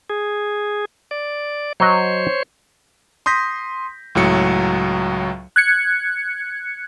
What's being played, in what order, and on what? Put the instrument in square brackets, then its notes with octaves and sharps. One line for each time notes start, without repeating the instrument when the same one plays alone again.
[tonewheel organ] G#4
D5
[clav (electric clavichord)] F#3 D#5 [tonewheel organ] C5 C#5
[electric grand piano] C6 D#6 G6 A#6 B6
C#2 A2 F#3 C#7
[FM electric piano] F#6 G#6 C#7